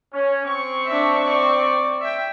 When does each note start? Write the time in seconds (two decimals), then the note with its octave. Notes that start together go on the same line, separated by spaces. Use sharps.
0.12 C#4
0.45 C4 C#6
0.87 D4 E5
1.24 D5
2.01 E5 G5